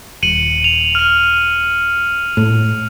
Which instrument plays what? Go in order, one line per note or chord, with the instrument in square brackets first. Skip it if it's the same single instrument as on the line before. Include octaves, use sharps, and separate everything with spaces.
[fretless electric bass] D#1 [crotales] C#7 D#7 F#7
[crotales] F7
F6 D#7
[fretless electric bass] A2